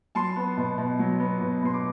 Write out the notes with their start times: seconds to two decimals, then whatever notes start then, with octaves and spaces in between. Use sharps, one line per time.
0.15 F#3 A5 C6
0.36 B3
0.57 B2
0.78 B2
0.99 F#3
1.20 B3
1.41 B2
1.63 B2 C6
1.74 D6